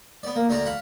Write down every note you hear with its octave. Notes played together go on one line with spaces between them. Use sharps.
B3 D5
A#3
D2 D4 F#4 D5 A#5
F5 F#5 B5